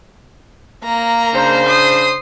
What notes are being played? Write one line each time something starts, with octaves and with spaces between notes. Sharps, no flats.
A#3 A#5
C#3 D4 C5
D#6 C7